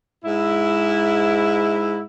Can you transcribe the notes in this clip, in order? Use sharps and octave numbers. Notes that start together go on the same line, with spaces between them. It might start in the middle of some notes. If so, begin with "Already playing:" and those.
G#2 E4